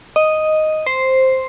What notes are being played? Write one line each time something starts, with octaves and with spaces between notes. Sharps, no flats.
D#5
C5